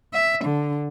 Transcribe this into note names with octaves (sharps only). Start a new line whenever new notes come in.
E5
D3